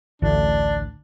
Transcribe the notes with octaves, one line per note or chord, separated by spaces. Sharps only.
A1 D2 A2 D4